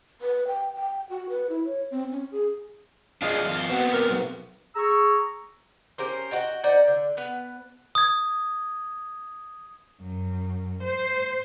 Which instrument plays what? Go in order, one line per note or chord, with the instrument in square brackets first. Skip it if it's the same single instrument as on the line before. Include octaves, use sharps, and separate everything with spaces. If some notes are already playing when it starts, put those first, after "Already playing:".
[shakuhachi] B4
G5
G5
F#4
B4
E4
C#5
C4
C#4
G#4
[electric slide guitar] D4 F4 G#4 [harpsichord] D5 D#5 F5
[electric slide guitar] F#2 F4
[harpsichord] B2 [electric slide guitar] B3 C4
[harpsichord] A#4 D5
B1
[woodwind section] G#4 A#5 C#6 E6
[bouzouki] C#4 G4 A#4 C5
F#4 D#5 G5
D#4 C5 D5 F#5
D3
B3 B4
[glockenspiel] D#6 G#6
[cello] F#2
C5